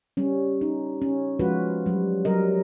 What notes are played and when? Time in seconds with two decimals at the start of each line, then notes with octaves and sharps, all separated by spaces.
0.17 G3 C#4
0.61 D#4
1.02 C#4
1.39 F3 G#3 F4 F#4 B4
1.86 F#3 G3
2.25 F#3 G3 A#4 D#5